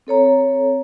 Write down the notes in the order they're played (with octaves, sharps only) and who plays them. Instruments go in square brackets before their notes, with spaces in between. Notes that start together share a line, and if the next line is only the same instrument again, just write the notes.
[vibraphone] C4 A4 C#5 A#5